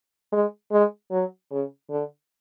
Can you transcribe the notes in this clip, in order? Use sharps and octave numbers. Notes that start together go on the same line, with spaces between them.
G#3
G#3
F#3
C#3
D3